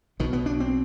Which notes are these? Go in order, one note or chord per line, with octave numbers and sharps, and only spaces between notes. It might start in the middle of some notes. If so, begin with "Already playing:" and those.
B1 B2 D#3
B3
D4
C4